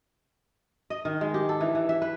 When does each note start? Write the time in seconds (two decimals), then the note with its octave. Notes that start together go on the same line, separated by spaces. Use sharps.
0.90 D#5
1.05 D#3
1.21 G#3
1.34 G4
1.49 A4
1.61 E3
1.75 E3
1.89 E5
2.02 B4